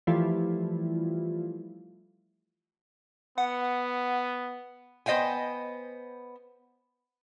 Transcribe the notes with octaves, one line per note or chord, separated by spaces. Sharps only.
E3 F3 G3 A3 E4 F4
B3 F#5
B3 C5 D#5 F5 G5 G#5